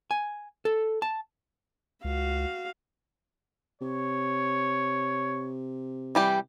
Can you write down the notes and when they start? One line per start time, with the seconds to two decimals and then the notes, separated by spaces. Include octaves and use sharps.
0.11 G#5
0.65 A4
1.02 A5
2.04 C#2 F#4 F5
3.81 C3 C#5
6.15 E3 G3 G4